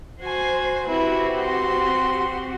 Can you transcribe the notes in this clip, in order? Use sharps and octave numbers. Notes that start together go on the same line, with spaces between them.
F#4 C5 G#5
C4 E4 F#4 G4 B4
C6